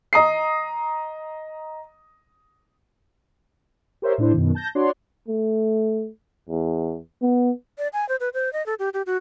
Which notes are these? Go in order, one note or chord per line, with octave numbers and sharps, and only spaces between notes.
D#5 A#5 D#6 C7
G4 A#4 C5 C#5 E5
A2 D4 E4 C5
F#2 B2 D#3
A5 G6 A#6
D4 F#4 C#5 D5 F#5 C6
A3
E2
B3
D5
G#5
C5
B4
C5
D#5
A4
G4
G4
F#4